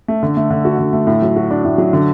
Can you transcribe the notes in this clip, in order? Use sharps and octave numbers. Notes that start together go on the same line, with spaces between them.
A3
D3
A3
D3
F#4
D3
A3
A2
F#3
F#4
D4
A2
F#3
D3